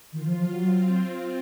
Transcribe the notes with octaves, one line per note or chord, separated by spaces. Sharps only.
D#3 F4
F3
F3
F#3
C4